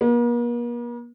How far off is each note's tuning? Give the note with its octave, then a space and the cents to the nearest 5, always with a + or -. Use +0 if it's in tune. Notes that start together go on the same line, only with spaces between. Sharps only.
A#3 +45